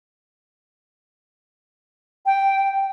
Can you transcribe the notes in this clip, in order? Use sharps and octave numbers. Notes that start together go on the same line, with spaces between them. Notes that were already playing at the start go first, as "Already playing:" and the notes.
G5